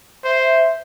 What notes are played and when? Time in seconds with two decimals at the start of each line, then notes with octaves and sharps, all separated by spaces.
0.24 C5 E5